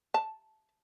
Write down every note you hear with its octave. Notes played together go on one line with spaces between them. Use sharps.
A5